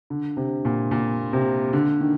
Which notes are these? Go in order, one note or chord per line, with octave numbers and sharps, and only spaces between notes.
D3
C3
A#2
A#2
C3
D3
D#3